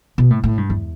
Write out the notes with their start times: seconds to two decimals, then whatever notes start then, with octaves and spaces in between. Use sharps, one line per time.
0.18 B2
0.30 A2
0.44 A2
0.57 G2
0.70 E2